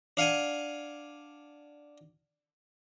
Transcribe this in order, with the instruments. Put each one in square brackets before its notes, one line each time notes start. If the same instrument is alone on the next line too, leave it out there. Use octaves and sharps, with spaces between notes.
[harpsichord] D4 F5 F#5 G#5